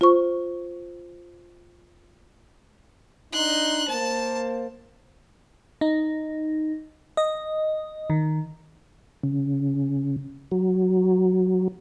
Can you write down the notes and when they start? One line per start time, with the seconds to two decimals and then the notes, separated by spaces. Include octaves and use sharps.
0.01 F4 C5 C#6
3.32 D4 D#4 C6 F#6
3.88 A#3 C5 A5
5.81 D#4
7.17 D#5
8.10 D#3
9.23 C#3
10.51 F#3